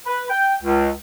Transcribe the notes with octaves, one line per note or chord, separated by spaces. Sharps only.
B4
G5
C#2